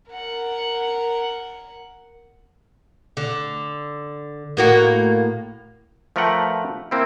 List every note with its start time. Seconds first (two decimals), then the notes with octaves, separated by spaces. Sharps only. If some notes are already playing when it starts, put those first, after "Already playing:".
0.12 A#4 F#5
3.17 D3
4.57 A2 A#3 F#4
6.16 F3 A3 A#4 B4 F#5 G5
6.91 A#3 C4 E4